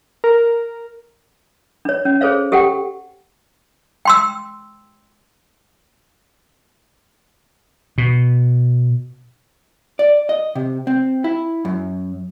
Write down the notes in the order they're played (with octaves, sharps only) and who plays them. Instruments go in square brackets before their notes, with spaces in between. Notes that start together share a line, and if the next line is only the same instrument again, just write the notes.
[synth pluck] A#4
[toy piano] D4 C#5
C#4
G#4 A4 C5 C#5 F5
G4 A4 F#5 G5
G5 C6 E6
[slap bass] B2
[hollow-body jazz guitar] D5
D#5
C3
C4
E4
F#2